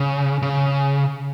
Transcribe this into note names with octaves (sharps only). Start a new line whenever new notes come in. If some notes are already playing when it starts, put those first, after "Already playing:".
Already playing: C#3
C#3